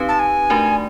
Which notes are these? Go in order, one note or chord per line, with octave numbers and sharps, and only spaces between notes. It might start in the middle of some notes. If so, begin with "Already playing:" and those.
Already playing: C4 D#4 G4 B4
A5
G#5
A3 D4 F#4 A#4 D5